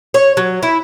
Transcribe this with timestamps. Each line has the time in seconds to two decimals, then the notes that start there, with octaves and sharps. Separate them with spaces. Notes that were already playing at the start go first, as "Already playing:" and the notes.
0.14 C#5
0.37 F#3
0.63 E4